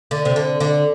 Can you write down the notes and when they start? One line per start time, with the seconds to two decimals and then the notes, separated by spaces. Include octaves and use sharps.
0.11 D3
0.25 C3
0.36 D3
0.60 D3